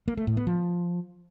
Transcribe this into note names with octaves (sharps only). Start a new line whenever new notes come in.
A#3
A3
A2
B3
F3